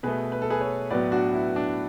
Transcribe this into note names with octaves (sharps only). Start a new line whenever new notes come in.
B2 A3 G#4 B4
B4
A4
G#4 B4
A4 C#5
A2 F#3 B3 B4 D5
D4 F#4
E4
D4